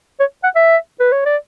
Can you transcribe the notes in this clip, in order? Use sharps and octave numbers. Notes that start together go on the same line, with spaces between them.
C#5
F#5
E5
B4
C#5
D5